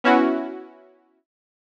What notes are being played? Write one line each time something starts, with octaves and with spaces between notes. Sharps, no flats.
B3 C#4 E4 F#4